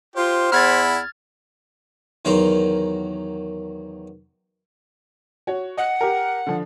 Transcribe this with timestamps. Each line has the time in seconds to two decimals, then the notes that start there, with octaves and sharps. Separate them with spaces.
0.16 F4 G4 C5
0.52 E2 E4 B5 F6 G#6 A6
2.25 E2 D#3 F#3 A#4 C6
5.47 F#4 C#5
5.77 D#5 F#5
6.01 G4 A#4
6.47 D3 F3